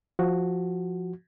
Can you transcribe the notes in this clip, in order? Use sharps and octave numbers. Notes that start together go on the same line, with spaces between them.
F3 F#4